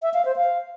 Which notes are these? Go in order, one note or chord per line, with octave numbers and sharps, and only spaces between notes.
E5
F5
C5
F5